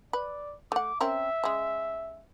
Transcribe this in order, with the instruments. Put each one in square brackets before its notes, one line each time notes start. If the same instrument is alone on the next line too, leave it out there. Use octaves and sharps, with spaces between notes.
[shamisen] B4 [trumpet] D5
[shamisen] A3 F#5 [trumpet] D6
[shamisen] C4 C#4 A#4 [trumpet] E5
[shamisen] C#3 G#3